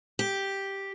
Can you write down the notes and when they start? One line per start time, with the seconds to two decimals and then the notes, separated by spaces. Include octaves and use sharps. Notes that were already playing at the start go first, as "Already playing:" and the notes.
0.19 G4